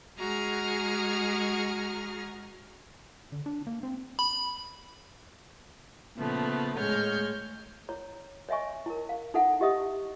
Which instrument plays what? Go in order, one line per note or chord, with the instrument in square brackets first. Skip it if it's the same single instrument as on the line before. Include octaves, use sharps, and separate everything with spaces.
[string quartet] G#3 F#4 G#4 A#5 F6 G#6
[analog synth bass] D3
D4
A#3
C4
[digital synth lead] B5
[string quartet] A#2 C#3 F3 A3 B3
A2 G#3 C#5 F6 G6
[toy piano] E4 C#5 A#5
C#5 D#5 E5 G#5 C#6
E4 A#4
F5
D#4 E4 A4 E5 F#5
E4 G4 D#5 E5 D#6